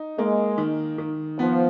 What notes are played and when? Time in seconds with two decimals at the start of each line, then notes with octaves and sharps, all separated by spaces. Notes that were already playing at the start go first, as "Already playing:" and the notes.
Already playing: D#4
0.18 G#3 A#3
0.58 D#3
0.98 D#3
1.38 F3 B3